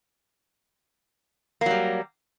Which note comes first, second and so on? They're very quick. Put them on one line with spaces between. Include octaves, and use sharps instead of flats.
A#3 F#3 G3